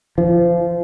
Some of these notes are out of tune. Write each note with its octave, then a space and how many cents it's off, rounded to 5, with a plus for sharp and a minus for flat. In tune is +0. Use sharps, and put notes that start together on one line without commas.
F3 -25